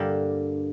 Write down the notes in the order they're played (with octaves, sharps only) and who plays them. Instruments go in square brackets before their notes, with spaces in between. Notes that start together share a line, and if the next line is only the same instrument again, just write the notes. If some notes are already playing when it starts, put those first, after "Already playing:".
Already playing: [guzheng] G2 D3 G3 A#3 D4